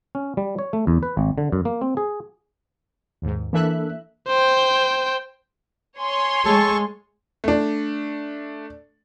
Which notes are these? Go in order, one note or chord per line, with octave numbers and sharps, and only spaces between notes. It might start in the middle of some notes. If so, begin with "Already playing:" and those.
C#4
G3
C#5
A3
E2
B4
G#1
D3
F#2
A#3
C4
G#4
D#2 G#2
E3 A#3 D4 A4 E5 F#6
C5 G5
C#5 G#5 C6
G#3 A4 A5 C#6
A3 D4